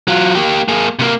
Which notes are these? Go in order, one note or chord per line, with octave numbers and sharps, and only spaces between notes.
F#3 F4
A#3 G4
A#3 G#4
C3 A#3